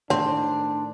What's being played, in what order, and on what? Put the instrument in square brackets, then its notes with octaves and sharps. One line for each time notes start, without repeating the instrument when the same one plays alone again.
[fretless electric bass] A2 D#3 [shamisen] C4 [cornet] D4